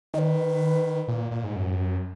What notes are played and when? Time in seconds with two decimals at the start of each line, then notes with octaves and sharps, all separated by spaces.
0.14 D#3 D#5
0.18 B4
1.08 A#2
1.31 A#2
1.44 G#2
1.56 F#2